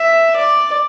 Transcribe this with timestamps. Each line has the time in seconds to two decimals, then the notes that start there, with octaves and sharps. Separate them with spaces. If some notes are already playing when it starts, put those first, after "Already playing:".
Already playing: E5
0.36 D5